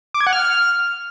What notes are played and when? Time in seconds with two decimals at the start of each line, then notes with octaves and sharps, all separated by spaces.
0.14 D6
0.21 G#6
0.27 F#5
0.33 F6